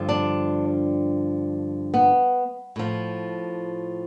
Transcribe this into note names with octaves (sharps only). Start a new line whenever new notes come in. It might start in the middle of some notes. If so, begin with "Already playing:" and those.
Already playing: G2 D3 F3
D4
B3
A2 F3